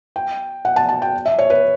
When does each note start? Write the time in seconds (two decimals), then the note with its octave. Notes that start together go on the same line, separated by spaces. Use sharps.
0.16 G5
0.65 F#5
0.76 A5
0.89 A5
1.02 G5
1.25 E5
1.39 C#5
1.50 B4